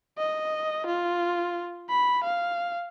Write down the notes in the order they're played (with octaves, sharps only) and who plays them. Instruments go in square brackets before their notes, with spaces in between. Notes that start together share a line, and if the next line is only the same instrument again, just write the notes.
[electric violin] D#5
F4
B5
F5